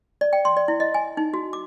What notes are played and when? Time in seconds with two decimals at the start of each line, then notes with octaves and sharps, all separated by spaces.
0.21 D5
0.33 G5
0.45 C6
0.57 D5
0.68 E4
0.80 D#5
0.94 G#5
1.17 D#4
1.34 F#4
1.53 D6